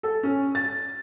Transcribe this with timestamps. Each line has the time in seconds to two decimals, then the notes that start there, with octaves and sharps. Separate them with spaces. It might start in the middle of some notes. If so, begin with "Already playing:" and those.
0.03 A4
0.23 C#4
0.55 A6